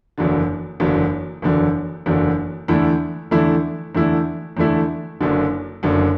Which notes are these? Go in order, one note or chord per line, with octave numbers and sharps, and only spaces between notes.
F#1 E2 D3 F#3
F#1 E2 D3 F#3
F#1 E2 D3 F#3
F#1 E2 D3 F#3
E2 D3 A3 E4
E2 D3 A3 E4
E2 D3 A3 E4
E2 D3 A3 E4
F#1 F#2 D3
F#1 F#2 D3